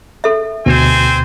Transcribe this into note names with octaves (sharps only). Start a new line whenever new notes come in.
A4 E5
D2 B2 C4 C5 G#5